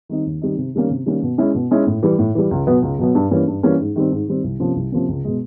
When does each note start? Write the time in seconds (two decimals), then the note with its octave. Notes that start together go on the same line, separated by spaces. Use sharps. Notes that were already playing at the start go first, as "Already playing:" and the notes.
0.09 D#3 G3 C4 D#4
0.26 D#2
0.42 D#3 G3 C4 D#4
0.57 C3
0.75 D#3 G3 A#3 C#4
0.90 C3
1.06 D#3 G3 A#3 C#4
1.22 B2
1.38 G#3 C#4 E4
1.55 B2
1.71 G#3 C#4 E4
1.87 A2
2.03 E3 G3
2.19 A2
2.35 E3 G3
2.51 C#2
2.67 B2 F#3 B3
2.82 C#2
2.99 B2 F#3 B3
3.15 G2
3.31 E3 G3 A#3 C#4
3.47 G2
3.63 E3 G3 A#3 C#4
3.79 G#2
3.96 D#3 G3 C4
4.12 G#2
4.28 D#3 G3 C4
4.44 C2
4.60 C3 F3 A#3 C#4
4.76 C2
4.92 C3 F3 A#3 C#4
5.08 C#2
5.25 B2 G#3